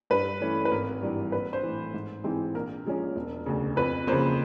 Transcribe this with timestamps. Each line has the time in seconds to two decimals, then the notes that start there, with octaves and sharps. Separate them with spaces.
0.10 G2 B4
0.41 E3 A3 C#4
0.65 B4
0.71 G#1 A#4
1.02 G2 E3 G3
1.32 A#1 B4
1.53 C5
1.63 A2 E3
1.94 G#2
2.24 E3 G#3 C4 D#4
2.54 A#1 A#4
2.85 A#2 F3 G#3 C#4
3.16 E1
3.46 D2 C#3
3.76 F2 B4
4.07 C#3 F3 A#3 C5